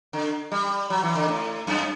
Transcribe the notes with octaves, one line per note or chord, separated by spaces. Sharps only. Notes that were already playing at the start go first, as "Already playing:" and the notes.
D3
G3
F#3
E3
D3
A2
F#2